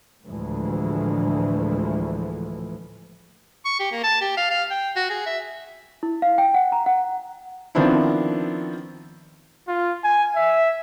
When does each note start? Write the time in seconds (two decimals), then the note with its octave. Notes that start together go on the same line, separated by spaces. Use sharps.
0.25 D2 A2 E3 F3 G#3
3.65 C#6
3.80 G4
3.92 A#3
4.04 A5
4.21 G4
4.37 F5
4.50 F5
4.70 G5
4.96 F#4
5.10 G#4
5.26 E5
6.03 E4
6.22 F5
6.38 G5
6.54 F#5
6.72 A#5
6.86 F#5
7.75 D#3 F3 B3 C4 D4 E4
9.68 F4
10.04 G#5
10.36 E5